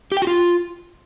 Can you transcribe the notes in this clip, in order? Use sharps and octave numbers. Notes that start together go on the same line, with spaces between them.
G4
G5
F#4
F4